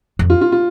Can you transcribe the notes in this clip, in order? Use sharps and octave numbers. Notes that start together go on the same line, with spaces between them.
F2
F4
F4
F4